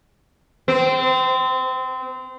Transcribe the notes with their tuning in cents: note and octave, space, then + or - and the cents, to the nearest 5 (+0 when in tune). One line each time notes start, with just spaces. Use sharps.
C4 -25